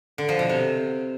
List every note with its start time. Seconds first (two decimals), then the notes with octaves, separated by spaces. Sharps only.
0.18 D3
0.29 F3
0.39 B2
0.49 C3